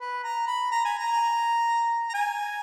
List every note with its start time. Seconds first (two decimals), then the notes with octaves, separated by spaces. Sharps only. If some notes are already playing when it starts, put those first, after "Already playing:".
0.01 B4
0.24 A#5
0.47 B5
0.71 A#5
0.85 G#5
0.99 A#5
2.09 A#5
2.14 G#5